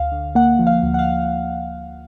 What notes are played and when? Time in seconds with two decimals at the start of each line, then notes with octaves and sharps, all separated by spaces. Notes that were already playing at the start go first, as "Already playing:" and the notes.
Already playing: D2 F5
0.12 D3
0.35 A#3 F#5
0.59 F3
0.67 F5
0.83 D2
0.94 F#5
0.99 F5